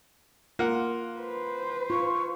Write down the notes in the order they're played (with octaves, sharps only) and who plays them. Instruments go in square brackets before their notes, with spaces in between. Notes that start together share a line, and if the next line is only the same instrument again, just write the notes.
[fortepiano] A#3 F#5 [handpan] F4
[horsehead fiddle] B4 C5
[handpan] F4 [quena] C#6